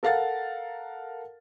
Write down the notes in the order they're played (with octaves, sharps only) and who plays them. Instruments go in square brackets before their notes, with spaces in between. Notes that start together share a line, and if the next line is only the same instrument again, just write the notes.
[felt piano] A4 A#4 F5 F#5 A6